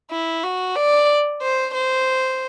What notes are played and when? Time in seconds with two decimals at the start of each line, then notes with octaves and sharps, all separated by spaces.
0.11 E4
0.43 F#4
0.76 D5
1.42 C5
1.74 C5